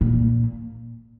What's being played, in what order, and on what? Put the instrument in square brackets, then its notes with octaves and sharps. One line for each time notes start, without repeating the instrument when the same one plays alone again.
[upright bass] A#2